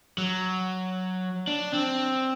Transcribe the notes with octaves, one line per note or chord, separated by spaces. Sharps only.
F#3
D4
C4